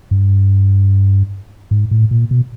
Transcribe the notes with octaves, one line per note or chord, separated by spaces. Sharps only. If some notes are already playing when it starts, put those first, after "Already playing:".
G2
G#2
A2
A#2
B2